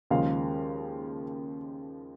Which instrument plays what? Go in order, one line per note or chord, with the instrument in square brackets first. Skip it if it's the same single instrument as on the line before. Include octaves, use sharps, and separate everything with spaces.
[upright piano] D#2 C#3 F3 G#3 F5